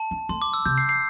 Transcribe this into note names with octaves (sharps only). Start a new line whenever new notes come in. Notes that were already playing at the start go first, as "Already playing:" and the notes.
Already playing: A5
D4
A3 C6
D6
E6
C3 G6
C7
C7